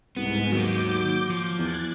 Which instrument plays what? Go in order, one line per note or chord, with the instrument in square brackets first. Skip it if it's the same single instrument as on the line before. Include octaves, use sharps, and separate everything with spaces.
[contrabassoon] C2 [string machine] G#2 [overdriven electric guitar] B3
[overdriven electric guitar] D#3 A#3 [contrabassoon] F#3 [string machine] D6 G6
[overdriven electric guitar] F3
[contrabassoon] E2 [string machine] F#6 G#6 A6